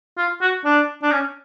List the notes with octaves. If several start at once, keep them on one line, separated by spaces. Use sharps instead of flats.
F4
F#4
D4
D4
C#4